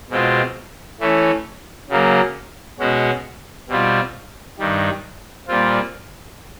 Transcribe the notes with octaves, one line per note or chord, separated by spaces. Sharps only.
B2 G#3 C4 F4
E3 A3 C#4
C#3 F#3 A#3
B2 G#3 C#4 F#4
B2 G3 C4 F4
G2 D#3 G3
A#2 G3 C4 F4